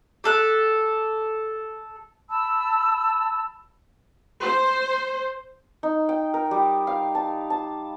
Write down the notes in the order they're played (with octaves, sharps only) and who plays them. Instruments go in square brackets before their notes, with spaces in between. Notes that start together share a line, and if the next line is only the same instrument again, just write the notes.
[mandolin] G4 A4 F#6
[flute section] A5 B5 E6
[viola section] C5
[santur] D#4
G5
A#4
G3
F5
A5
A5